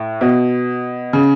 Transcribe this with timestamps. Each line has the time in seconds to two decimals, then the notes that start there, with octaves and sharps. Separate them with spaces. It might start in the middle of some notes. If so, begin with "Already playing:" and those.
Already playing: A2
0.21 B2
1.13 C#3